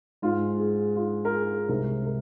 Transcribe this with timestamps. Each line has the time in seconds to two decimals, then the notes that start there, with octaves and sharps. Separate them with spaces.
0.22 G#2 G#3 F4
0.59 G#4
0.96 F4
1.25 A#4
1.33 G#4
1.69 C2 C3 G#3 A#4
2.06 A#4